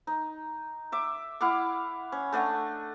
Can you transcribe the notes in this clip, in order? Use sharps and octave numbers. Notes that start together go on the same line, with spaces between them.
D#4
E5 D6
E4 F5 F#5 D6
C#4
A3 D4 D#5 F#5